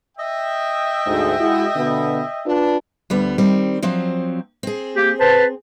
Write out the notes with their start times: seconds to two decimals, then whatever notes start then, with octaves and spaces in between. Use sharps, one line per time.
0.18 D#5 E5 G5
1.06 D2 G#2
1.40 G#3 E4 F#4
1.76 B2 D3 B3
2.46 D4 F4 B4
3.10 D2 G3 B3
3.38 D#3 G3 C4
3.82 F3 F#3 C4
4.63 C4 G#4
4.96 A#3 G4
5.20 B4 C5 A5